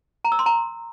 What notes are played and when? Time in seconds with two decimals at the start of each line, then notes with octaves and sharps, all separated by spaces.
0.25 A#5
0.32 E6
0.39 C6
0.46 A#5